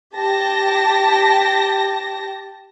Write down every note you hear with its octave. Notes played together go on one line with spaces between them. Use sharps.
G4 A5 A#6